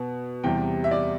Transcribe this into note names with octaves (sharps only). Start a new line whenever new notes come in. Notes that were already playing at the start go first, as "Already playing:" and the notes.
Already playing: B2 B3
E2 C3 G3 G5
E5
D5